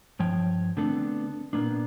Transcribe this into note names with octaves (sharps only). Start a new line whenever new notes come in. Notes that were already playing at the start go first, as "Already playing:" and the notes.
G2 F3 C#5 G5
D3 A3 B3 C4 D4 A4
A#2 A#3 B3 D4